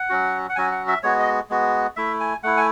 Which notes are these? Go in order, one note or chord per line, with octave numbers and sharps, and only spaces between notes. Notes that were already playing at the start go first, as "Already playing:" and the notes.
Already playing: F#5
F#3 C#4 F#4
F#5
F#3 C#4 F#4 G#5
F#5
E5
G#3 B3 F#4 C#5
D#5
G#3 B3 F#4
A3 E4 E5
G#5
A3 E4 F#5
G#5